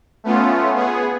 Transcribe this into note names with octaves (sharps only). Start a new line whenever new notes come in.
A3 B3 C#4 F4
B3 G#4